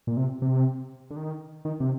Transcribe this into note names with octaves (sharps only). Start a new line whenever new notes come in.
A#2
C3
C3
D3
D#3
D#3
C3